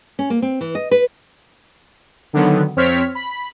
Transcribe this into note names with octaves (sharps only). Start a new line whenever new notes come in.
C#4
A#3
C4
E3
D#5
B4
D3 D#3 F#3 B3
F2 C4 C#5 F6 B6
B5